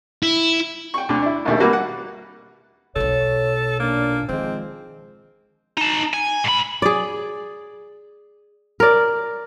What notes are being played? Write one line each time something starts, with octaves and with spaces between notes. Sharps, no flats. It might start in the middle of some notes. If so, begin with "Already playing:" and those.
E4
G5 C#6
D2 D3
D4 E4
A#1 D#2 A3
G3 A#3 F#4 B4
F#5
B1 B2 A4 C#5
A#2 A#3 D4
D#3 F3 G#3 C4
D#4 A5
G#5
G#2 B5
G#4 D5
A#4 D5